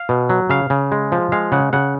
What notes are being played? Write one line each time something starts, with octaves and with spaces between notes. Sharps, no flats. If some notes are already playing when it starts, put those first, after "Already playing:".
Already playing: F5
B2
F#3
C#3 F5
C#3
G#3
F3
G#3 F5
C#3 F#5
C#3 F#5